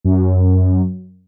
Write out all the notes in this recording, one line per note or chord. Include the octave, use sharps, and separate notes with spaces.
F#2